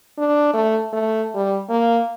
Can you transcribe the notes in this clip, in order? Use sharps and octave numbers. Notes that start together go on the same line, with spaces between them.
D4
A3
A3
G3
A#3